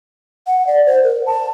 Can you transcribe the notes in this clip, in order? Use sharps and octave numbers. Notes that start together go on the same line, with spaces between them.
F#5
D5
C5
A#4
A5